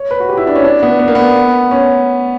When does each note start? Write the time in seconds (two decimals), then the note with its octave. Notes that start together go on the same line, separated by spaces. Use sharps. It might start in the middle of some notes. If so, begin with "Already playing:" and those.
Already playing: C#5
0.11 B4
0.20 F#4
0.29 G4
0.37 E4
0.47 D4
0.55 C#4
0.64 D4
0.83 B3
0.99 B3
1.08 A#3
1.15 B3
1.71 C#4